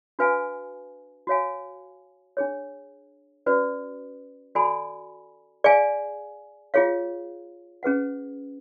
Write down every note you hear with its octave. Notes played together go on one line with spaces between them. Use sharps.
D4 F#4 B4 F5 G#5
F#4 C#5 F5 G#5
D4 G#4 C#5
C#4 F#4 B4 D5
F#4 A4 D5 G#5 B5
G#4 D5 F5 G#5
F4 G#4 C#5 F5
C#4 G#4 B4 F#5